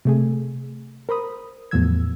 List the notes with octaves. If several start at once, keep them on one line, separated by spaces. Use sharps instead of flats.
C3 A3 G#4
A#4 C5 B5 D#6
E2 A2 F3 F#3 E6 G#6